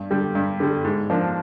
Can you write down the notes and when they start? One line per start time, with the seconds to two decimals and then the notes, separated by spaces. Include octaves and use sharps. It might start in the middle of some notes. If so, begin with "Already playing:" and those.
Already playing: G2
0.10 D3 G3
0.35 G2
0.60 D3 G3
0.84 G#2
1.10 F3 A#3 D4